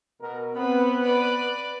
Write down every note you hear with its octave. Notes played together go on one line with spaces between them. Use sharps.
B2 A#4
B3 C4 B4
B4 D5